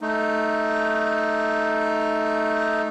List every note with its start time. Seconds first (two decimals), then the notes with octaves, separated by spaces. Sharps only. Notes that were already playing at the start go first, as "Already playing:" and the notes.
0.01 A3 D#4